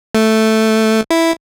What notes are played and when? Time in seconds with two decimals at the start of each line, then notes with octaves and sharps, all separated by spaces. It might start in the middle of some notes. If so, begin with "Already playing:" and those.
0.15 A3
1.10 E4